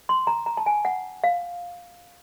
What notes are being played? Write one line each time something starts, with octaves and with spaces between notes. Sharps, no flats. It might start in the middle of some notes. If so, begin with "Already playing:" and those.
C6
A#5
A#5
A5
G#5
F#5
F5